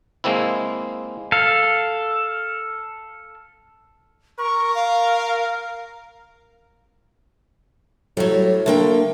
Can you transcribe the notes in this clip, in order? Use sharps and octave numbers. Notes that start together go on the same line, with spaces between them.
G#3 A#3 C4 E4
A4 F5
A#4 C#6
F5
A2 F#3 G3
D3 A3 A#3 G5